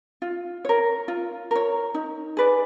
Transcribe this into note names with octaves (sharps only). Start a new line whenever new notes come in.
F4
A#4 C#5
F4
A#4 C#5
D#4
G#4 B4 D5